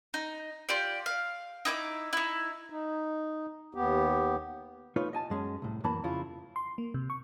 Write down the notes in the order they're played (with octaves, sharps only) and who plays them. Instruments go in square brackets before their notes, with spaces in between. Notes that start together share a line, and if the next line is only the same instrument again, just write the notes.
[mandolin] D#4
F4 G4 D5
F5
D#4 E4 G#5 D6
D#4 E4
[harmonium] D#4
D#2 B3 G4
[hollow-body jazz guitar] A3 D#4 F4 B4 C#5
D#5 G#5 A5
F#2 G#3 C#4
C2 A2
F#2 E3 A#3 A5 B5
F2 C#3 E4 F4
[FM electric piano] C6
A#3
C3
C#6